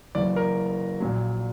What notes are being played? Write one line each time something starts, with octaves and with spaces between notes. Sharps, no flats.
F#1 F#2 E3 D5
A#4
A#1 A#2 F#3